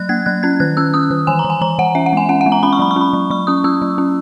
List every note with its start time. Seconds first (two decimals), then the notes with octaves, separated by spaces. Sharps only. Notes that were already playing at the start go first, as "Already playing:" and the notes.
Already playing: F#3 F#6
0.09 A#3 G#6
0.26 F#3 F#6
0.43 C#4 G#6
0.60 D#3 F#6
0.77 C#4 E6
0.94 C#4 D#6
1.11 D#3
1.27 E3 G#5
1.39 A#5
1.44 E3
1.50 G#5
1.61 E3 A#5
1.78 E3 F#5
1.95 C#4 E5
2.06 F#5
2.13 G#3 G#5
2.29 C#4 F#5
2.41 F#5
2.46 G#3
2.52 A#5
2.63 C#4 B5
2.73 C#6
2.79 F#3 B5
2.91 C#6
2.96 C#4 B5
3.13 F#3
3.30 F#3 C#6
3.47 C#4 D#6
3.64 C#4 E6
3.82 F#3
3.98 C#4